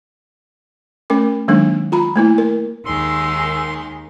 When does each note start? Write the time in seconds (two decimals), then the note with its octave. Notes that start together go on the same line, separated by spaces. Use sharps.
1.10 A3 C#4 A#4 D6
1.48 D#3 F#3 G#3 A#3 D4 D#4
1.92 F4 A#5 B5
2.16 A3 A#3 E4
2.38 A#4
2.86 D#2 D#3 G#3 C6 E6